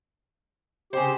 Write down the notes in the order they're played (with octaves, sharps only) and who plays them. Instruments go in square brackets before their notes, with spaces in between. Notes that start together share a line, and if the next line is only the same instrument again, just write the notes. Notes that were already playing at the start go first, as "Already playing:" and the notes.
[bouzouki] C#3 C5 [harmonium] G4